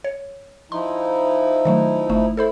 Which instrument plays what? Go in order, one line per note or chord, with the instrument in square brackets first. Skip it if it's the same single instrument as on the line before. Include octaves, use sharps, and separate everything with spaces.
[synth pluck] C#5
[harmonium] F3 D#4 E4 [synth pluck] C6
[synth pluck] D#3 F#3 A3
G1 A3
[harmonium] E4 [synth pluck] A4 C5 B5